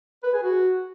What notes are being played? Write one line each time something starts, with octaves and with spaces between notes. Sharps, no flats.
B4
G#4
F#4